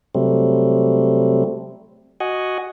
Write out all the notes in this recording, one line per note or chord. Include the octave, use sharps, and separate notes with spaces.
C3 F#3 G3 A3 C4
F#4 D#5 F#5 G#5